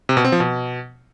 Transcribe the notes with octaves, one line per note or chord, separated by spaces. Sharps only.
C3
B2
C4
F3
B2